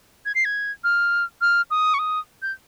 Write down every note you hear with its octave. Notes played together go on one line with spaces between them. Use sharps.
G#6
C7
G#6
F6
F6
D#6
C#6
D#6
G6